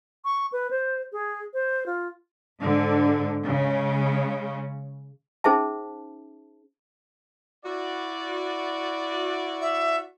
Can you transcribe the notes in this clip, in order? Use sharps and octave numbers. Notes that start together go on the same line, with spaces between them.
C#6
B4
C5
G#4
C5
F4
G#2 D3
C#3 G#3 C#4
C#4 D#4 G#4 C5 E5 A5
E4 F#4 D5
E5